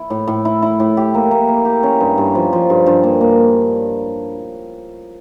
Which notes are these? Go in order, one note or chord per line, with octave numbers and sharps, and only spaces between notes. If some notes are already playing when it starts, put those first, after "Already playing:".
Already playing: E4
A2
A2
E4
E4
A2
G4
A#3
A#3
A#3
G4
C#4
G2
G2
F3
F3
G2
G2
A#3
A#3